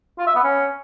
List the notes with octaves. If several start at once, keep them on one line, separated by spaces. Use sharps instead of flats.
F4
E5
B3
C#4